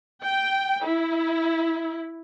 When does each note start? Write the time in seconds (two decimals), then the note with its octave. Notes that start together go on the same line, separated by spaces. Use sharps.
0.24 G5
0.83 E4